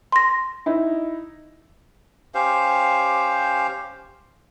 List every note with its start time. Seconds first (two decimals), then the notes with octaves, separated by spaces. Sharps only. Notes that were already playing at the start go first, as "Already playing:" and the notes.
0.12 C6 A#6
0.66 D#4 E4
2.34 C#4 G4 C5 F5